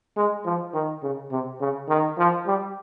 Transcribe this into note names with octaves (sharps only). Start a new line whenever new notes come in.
G#3
F3
D#3
C#3
C3
C#3
D#3
F3
G3